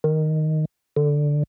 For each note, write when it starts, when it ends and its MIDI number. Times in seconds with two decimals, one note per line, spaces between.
0.04 0.65 51
0.97 1.43 50